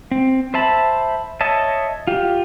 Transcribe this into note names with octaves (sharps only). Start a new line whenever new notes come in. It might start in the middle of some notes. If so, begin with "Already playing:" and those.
C4
C5 E5 A5 B5
C#5 D#5 E5 A5
F4 G4